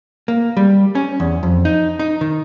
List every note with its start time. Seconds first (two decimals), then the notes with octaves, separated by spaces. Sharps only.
0.28 A#3
0.57 G3
0.95 C#4
1.20 E2
1.43 F2
1.65 D#4
1.99 D#4
2.21 D#3